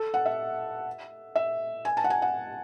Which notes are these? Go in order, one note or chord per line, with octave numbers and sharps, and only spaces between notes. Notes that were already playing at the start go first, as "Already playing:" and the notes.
Already playing: A4
F#5
E5
E5
G#5
A5
F#5
G#5
F#5